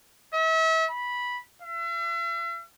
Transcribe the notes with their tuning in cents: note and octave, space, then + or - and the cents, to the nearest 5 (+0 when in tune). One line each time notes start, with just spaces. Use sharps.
E5 -35
B5 -10
E5 +45